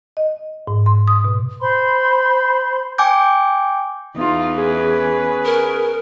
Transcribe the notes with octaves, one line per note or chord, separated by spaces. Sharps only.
D#5
G#2
C6
D#6
B2
C5 B5 C6
G5 G#5 D6 G6
E2 D#4 F4
C#4 G#4 B4
A#4